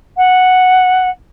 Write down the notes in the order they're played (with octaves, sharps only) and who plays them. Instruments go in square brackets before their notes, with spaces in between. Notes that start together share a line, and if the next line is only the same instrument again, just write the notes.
[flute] F#5